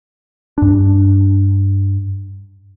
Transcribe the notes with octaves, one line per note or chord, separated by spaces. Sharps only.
G2 D4